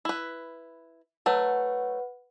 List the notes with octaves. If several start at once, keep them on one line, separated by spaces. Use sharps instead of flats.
E4 B4
F#3 A3 B4 F#5